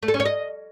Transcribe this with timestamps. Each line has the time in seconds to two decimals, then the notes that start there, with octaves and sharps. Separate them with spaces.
0.03 A3
0.08 A4
0.14 C#4
0.20 C#5
0.25 D#5